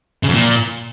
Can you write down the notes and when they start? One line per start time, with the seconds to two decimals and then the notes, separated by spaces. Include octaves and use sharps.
0.23 C#3
0.28 F2
0.33 A#2